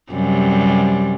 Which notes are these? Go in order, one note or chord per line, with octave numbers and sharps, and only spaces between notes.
F#2 C3 G3